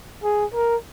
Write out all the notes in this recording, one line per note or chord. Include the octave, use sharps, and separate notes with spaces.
G#4
A#4